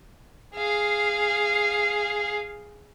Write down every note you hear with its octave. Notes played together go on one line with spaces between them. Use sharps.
G#4 F5